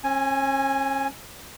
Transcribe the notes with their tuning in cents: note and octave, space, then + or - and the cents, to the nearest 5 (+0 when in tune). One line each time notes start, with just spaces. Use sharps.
C#4 -45 G#5 +0